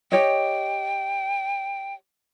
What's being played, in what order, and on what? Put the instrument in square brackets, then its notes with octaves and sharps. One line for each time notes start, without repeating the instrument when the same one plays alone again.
[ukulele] G4 C#5 D#5 [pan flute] G5